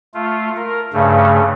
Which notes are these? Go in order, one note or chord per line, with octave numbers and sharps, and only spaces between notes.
A3 F4
A#4
G2 C#3 A3